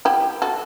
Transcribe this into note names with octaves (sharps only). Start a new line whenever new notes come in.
E4 G4
F#4 A4